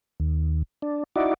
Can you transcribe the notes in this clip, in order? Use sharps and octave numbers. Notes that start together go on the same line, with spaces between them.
D#2
D4
D#4 E4 F#4 D5